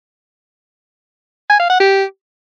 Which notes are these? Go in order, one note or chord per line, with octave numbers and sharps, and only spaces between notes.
G#5
F5
F#5
G4